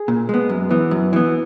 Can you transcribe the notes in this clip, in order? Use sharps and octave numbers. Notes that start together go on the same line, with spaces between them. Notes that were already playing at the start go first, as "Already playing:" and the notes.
Already playing: G#4
A#2
G#3 B3
F#2
E3 B3
F#2
E3 B3